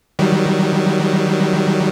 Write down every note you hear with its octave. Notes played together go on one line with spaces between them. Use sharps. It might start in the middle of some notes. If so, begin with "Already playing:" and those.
D#3 F#3 G3